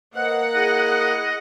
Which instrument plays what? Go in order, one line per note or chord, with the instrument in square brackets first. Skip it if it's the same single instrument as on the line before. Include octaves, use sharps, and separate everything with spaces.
[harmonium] A#3 [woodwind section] B4 C5 D#5 [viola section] F#5
[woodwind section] E4 G#4 [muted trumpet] D#5